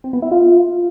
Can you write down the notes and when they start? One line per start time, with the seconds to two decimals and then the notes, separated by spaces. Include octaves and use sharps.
0.04 C4
0.13 B3
0.22 E4
0.31 F4